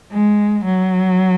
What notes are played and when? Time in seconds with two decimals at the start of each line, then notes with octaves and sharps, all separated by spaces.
0.12 G#3
0.65 F#3